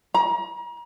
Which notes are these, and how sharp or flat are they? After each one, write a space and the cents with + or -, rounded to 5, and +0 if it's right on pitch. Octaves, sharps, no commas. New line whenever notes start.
A#5 +35